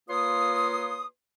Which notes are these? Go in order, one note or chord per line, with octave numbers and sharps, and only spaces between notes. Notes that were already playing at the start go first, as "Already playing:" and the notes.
A#3 F4 B4 C#5 C6 D#6